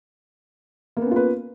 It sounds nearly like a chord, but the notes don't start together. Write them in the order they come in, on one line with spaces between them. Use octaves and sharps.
A#3 B3 C#4 F4 B4